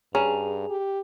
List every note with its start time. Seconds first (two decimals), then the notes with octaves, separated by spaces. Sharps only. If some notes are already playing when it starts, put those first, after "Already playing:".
0.15 G2 C#4 G#4 G#5 A#5
0.70 G4